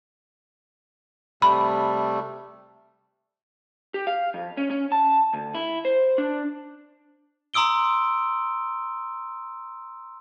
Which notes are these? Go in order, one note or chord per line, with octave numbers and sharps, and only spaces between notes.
C3 G3 A3 B5
G4
F5
F2
C#4
C#4
A5
D2
E4
C5
D4
A#5 C6 D#6 E6 D7 G7